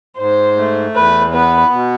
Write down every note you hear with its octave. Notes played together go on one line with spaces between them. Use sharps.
G#2 C5
A3
E2 B4
B3 B4
B2